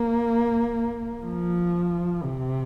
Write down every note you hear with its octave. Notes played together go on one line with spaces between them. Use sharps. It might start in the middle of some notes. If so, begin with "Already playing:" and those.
Already playing: A#3
F3
C3